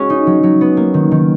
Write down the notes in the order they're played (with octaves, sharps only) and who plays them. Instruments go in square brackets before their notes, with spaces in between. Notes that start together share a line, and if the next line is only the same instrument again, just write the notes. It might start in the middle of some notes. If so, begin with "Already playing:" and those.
Already playing: [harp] G#3 C#4 F#4
D#4
F#3
F#3
B3
A#3
D#3
D#3